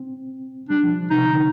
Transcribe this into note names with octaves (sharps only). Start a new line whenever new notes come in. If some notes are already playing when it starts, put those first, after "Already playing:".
Already playing: C4
G3 D4
F3
C3 D#4
D3